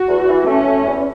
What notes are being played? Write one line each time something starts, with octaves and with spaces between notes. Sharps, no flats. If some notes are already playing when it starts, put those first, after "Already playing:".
Already playing: F#4
E2
E3
A3 C#4
A3
E2